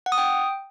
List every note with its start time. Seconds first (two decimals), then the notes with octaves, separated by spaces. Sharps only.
0.06 F#5
0.12 D#6
0.18 G5